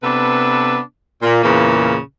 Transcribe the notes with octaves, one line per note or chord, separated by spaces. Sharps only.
C3 B3 D4 A4 B4
A#2
E2 A#2 C#3 E3 A#3